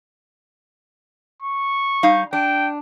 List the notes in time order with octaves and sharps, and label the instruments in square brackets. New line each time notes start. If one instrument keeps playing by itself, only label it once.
[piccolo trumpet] C#6
[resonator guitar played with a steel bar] G3 D#4 F5
[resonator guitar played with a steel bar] D4 [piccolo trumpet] G5